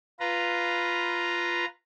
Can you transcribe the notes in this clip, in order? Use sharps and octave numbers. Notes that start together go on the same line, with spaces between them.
F4 B4 A#5